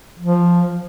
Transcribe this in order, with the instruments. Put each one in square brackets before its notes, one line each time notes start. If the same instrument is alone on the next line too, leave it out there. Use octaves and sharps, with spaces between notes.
[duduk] F3